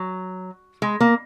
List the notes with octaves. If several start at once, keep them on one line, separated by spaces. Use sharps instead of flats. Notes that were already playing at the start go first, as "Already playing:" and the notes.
Already playing: F#3
G#3
A#3